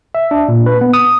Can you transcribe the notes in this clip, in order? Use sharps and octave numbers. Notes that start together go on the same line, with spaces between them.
E5
D4
A#2
B4
B3
D#6